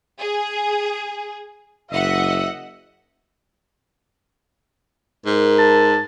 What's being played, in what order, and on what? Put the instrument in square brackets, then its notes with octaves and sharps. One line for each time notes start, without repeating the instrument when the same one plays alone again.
[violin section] G#4
[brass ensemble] F#1 E5 [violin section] D#5 F#5
[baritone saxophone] G#2 [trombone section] A#4
[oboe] A5